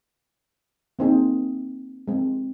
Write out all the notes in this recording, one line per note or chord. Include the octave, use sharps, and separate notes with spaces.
A#3 C4 D#4 G#4
G#3 C4